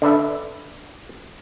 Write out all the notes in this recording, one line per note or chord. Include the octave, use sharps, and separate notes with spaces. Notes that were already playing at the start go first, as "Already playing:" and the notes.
D3 D4 B4 E5